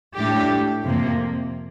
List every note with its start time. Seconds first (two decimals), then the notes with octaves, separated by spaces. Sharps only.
0.16 A2 A3 D4 G4
0.83 F2 C3 F3 A#3